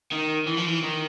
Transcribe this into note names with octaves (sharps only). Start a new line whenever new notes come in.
D#3
E3
F3
E3
D#3